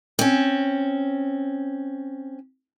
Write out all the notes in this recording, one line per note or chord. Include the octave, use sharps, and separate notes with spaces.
C4 C#4